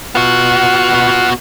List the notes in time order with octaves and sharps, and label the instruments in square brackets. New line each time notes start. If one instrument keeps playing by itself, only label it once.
[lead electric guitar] B3 F#4 [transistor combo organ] F4 F#5